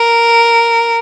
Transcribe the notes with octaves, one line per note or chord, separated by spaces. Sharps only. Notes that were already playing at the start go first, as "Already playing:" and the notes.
Already playing: A#4